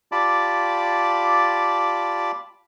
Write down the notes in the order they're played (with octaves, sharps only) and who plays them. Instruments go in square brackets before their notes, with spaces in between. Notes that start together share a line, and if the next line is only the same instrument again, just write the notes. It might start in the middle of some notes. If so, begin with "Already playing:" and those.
[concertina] F4 G4 D5 A5 B5 D6